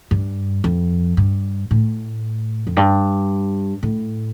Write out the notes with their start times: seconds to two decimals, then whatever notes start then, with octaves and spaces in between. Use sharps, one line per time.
0.11 G2
0.64 F2
1.17 G2
1.71 A2
2.67 F2
2.77 G2
3.83 A2